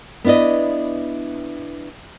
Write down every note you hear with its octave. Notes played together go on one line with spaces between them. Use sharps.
B3 D4 E4 D5 D#5